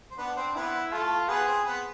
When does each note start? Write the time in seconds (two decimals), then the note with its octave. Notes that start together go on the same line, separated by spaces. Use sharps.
0.11 C5
0.18 B3 D4 B4
0.36 C4 C5
0.55 B3 E4 B4
0.92 A3 F4 A4
1.29 B3 G#4 B4
1.47 C4 C5
1.66 B3 B4